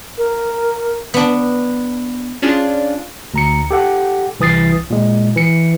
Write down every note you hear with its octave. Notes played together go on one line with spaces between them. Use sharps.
A#4
B3 D4
C#4 D4 F4 G#4
D2 A#5 C#7
G4 A4 F#5
C2 E3 D#6 A6 C7
A#2 G#3
E3 C#7